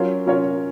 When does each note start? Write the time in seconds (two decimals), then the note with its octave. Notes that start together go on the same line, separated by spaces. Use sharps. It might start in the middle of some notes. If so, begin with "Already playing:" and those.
Already playing: F#3 C#4 F4 A#4 C#5
0.26 F#3 C#4 F4 A#4 C#5